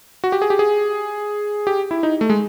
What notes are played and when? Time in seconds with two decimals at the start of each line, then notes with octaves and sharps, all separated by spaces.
0.24 F#4
0.32 G4
0.42 G#4
0.50 G4
0.59 G#4
1.67 G4
1.91 E4
2.03 D#4
2.21 A3
2.30 G#3